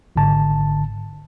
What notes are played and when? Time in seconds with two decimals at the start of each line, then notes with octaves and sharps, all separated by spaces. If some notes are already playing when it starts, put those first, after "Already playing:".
0.16 G#1 G#2 D3 A5